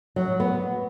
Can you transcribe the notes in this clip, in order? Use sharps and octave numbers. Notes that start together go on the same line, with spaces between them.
F#3
B3